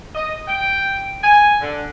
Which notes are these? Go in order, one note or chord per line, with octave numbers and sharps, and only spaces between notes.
D#5
G5
G#5
D3